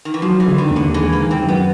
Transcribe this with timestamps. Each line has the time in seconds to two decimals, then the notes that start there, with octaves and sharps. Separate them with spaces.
0.05 D#3
0.14 E3
0.22 F3 F#3
0.40 E3
0.46 D3
0.58 D#3
0.70 D#2
0.76 D3
0.94 E3 G#3
1.13 A#3
1.18 D#3
1.31 C4
1.43 F#2
1.48 B3